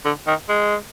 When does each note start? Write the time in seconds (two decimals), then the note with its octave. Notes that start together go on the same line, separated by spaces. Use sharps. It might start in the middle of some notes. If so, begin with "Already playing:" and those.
0.05 D3
0.27 D#3
0.49 G#3